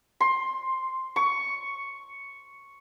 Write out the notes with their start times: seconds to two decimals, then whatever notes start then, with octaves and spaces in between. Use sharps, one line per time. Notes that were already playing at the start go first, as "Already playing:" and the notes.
0.20 C6
1.16 C#6